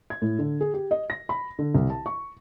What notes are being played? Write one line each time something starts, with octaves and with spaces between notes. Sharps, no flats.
G#6
A2
D3
G#4
G4
D#5
A#6
B5
D3
C2
A5
C#6